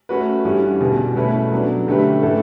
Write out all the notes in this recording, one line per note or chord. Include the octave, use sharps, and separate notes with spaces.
A3 C#4 F#4 B4
G2 E3 G3 C#4
E2 B2 G3
B2 A3 C#4 E4 B4
F#3 B3 D4
D3 A3 C#4 G4 B4
A2 E3 A3 E4 A4